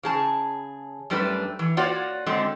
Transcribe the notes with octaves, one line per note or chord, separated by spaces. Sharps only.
C#3 G#4 A5
F#2 G3 A3 D4 B4
E3
A#3 F4 F#4 C#5 D5
D3 G#3 C4